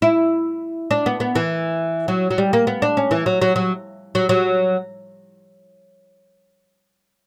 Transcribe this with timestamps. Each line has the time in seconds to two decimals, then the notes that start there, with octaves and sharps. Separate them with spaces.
0.02 E4
0.91 D4
1.06 B3
1.20 B3
1.35 E3
2.08 F#3
2.31 F#3
2.38 G3
2.53 A#3
2.67 B3
2.82 D4
2.97 C#4
3.11 E3
3.26 F#3
3.42 F#3
3.56 F#3
4.15 F#3
4.29 F#3